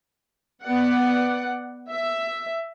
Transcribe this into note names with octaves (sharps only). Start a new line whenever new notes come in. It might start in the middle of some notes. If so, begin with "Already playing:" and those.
B3 D5 F#5
E5